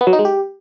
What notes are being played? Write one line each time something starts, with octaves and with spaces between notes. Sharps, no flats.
B3
F#3
D#4
G#3
G4